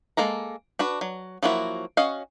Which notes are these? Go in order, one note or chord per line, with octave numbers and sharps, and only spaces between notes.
G#3 A#3 A4 A#5
D4 F#4 B4
F#3
F3 F#3 A#3 E4 F#4
C#4 F#4 D#5 F5